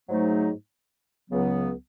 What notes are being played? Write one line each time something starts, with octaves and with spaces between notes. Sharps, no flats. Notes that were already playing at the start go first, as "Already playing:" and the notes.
G#2 F#3 A3 D#4
C#2 C#3 F#3 B3